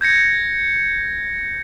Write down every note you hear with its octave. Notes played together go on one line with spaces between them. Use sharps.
G6 G#6 A#6 C#7